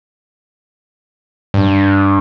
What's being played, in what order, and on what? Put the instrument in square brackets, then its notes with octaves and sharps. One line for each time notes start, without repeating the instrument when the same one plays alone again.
[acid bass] G2